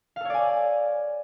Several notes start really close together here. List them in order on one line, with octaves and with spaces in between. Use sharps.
F5 A4 C#5 D5 G#5